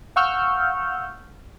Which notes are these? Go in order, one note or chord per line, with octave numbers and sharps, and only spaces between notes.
F5 F#5 C#6 E6 F6 G6